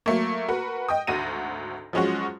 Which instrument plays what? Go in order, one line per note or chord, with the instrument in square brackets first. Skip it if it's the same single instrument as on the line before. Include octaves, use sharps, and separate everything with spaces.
[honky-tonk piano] F#3 A3 A#3
F#4 A#4 B4 F#5
D#5 G5 D#6
G#1 D2 F#4 A#6 D#7
F3 F#3 G#3 C#4 F4 F#4